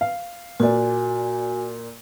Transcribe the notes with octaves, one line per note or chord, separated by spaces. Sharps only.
F5
A#2 F#4 D5 G#5